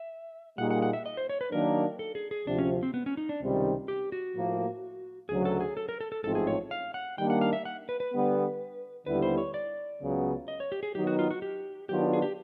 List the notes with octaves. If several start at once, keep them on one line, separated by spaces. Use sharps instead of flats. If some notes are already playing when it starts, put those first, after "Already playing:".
Already playing: E5
A#2 G3 A#3 D#4 G#4 F#5
F#5
F#5
E5
D#5
C5
C#5
B4
D#3 F#3 A#3 D4 A#4
A4
G#4
G#4
D2 C3 F3 D4
C#4
C4
B3
C#4
D#4
D4
C#2 C3 D#3 G3 C4
G4
F#4
A2 F3 A#3
D2 C#3 F#3 G#4
A4
G#4
A4
A#4
A4
A4
A1 G#2 F3 A3 C4 A4
G#4
C#5
F5
F#5
D#3 G3 A#3 D4 G5
F#5
F5
E5
F#5
B4
B4
D3 G3 B3
D#2 D3 G3 B3 E4 B4
C5
C#5
D5
C#2 C#3 F#3 B3
D#5
C#5
G4
G#4
D#3 F#3 B3 D#4 G4
F#4
F4
F#4
G4
D#3 F#3 B3 D4 F4 G4
G#4
G4